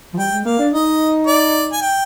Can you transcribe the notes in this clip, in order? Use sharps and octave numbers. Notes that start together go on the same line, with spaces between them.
F3
G3 G5
G#3
A#3 F5
D4
D#4 D#5
D5
G#5
G5